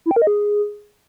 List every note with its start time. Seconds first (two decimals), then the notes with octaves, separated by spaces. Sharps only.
0.06 E4
0.11 G5
0.16 A#4
0.22 D#5
0.27 G#4